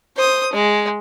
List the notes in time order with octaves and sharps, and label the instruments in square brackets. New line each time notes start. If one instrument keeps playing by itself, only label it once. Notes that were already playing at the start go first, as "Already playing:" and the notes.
[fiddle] C5 D#6
G#3